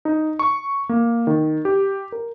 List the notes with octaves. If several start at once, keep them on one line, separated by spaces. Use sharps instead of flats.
D#4
C#6
A#3
D#3
G4
A#4